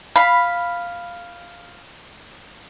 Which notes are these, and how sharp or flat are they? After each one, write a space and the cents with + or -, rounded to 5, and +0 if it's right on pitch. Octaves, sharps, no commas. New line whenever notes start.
F5 +0 B5 +0